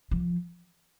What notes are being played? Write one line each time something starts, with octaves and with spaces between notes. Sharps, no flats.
F3